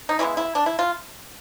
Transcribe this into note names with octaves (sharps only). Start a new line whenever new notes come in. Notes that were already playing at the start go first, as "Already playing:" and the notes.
D#4
C#3 E3 G#3 B3 E4
E4
D4
E4
F4